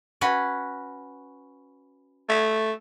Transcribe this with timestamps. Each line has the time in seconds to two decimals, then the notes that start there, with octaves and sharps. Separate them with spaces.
0.21 C#4 F#4 B4
2.29 A3